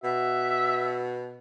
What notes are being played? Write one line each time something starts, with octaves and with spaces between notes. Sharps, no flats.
B2 F#4 E5